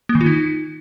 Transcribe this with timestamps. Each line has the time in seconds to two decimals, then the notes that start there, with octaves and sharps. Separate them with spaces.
0.09 A#3
0.15 D#3
0.21 F4
0.26 D#4